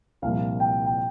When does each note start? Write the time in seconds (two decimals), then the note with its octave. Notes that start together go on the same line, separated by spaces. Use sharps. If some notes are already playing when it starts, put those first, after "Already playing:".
0.22 C2 A#2 F3 F5
0.60 G5
0.86 G5